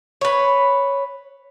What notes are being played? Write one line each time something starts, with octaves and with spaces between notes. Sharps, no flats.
B4 C#5